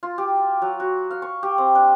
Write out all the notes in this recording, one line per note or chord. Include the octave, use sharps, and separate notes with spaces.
F4
G4
F#3
F#4
F5
C#6
G4
C4
D4